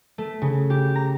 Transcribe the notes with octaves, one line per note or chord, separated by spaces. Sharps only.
A3
C#3
G4
A#5